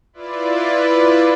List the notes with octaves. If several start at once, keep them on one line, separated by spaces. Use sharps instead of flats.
E4 F4 B4 D5